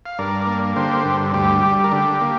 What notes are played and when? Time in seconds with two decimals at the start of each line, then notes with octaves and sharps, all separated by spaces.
0.06 F5
0.18 G2 A#4 D5
0.47 A#3
0.76 D3 G4 C5
1.05 G2
1.34 D2 G4
1.63 G3
1.84 A#4
1.91 D3 G4
2.21 A#3